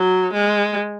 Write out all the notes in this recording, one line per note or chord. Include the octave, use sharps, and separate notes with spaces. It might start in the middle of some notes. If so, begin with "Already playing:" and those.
Already playing: F#3
G#3